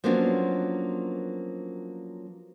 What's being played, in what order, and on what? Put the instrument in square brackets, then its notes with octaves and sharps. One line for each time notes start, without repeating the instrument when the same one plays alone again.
[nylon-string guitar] F3 F#3 A#3 B3 C#4 D4